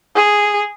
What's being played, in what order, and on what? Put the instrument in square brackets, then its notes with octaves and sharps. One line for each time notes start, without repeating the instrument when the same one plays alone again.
[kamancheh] G#4